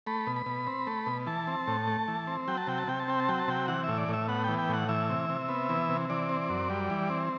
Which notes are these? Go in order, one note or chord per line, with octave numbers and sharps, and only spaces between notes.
A3 B5
B2
B5
B2
C4
A3
B2
E3 A5
C4
A2
A3
E3
C4
F#3 G5
A5
C3 G5
A5
C3 G5
A5
C4 G5
A5
F#3 G5
A5
C3 G5
E3 F#5
A2 E5
D5
A2 E5
B3 F#5
E3 G5
G5
A2 F#5
E3 E5
C3
C3
B3
E3
C3
E3 D5
C4
F#2
G3
E3
C4